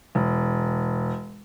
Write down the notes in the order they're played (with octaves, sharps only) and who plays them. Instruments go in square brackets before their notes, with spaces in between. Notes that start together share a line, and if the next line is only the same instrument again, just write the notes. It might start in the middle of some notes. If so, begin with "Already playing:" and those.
[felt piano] E1